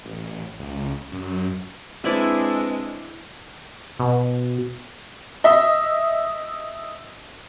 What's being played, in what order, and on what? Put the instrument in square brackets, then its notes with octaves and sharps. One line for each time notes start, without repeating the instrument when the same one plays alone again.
[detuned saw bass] A1
C#2
F#2
[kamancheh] G#3 D4 [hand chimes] C4 B4 C5 [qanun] E4 D5 E5
[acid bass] B2
[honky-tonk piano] D#5 E5